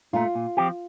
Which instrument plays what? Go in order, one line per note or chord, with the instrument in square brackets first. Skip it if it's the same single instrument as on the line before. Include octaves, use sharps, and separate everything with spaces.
[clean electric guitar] A#2 A3 [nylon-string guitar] F4
[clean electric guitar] A#2
F3 C4 G4